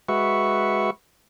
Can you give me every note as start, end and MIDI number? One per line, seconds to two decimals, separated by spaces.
0.09 0.90 56
0.09 0.90 66
0.09 0.90 71
0.09 0.90 76
0.09 0.90 85